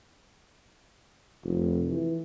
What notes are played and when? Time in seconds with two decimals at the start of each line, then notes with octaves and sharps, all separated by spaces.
1.43 F1
1.90 E3